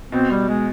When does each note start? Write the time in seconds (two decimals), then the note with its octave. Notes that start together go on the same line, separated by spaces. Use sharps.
0.12 B2 C4
0.31 G3
0.49 G#3